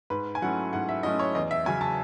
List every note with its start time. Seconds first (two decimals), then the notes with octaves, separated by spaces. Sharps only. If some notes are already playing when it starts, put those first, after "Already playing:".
0.10 G#2 B4
0.35 G#5
0.42 F#3 A3 C#4 E4 F#5
0.73 G#2 F#5
0.89 E5
1.03 F#3 A3 C#4 E4 D#5
1.19 C#5
1.35 E2 D#5
1.51 E5
1.65 C#3 F#3 C#4 G#5
1.81 A5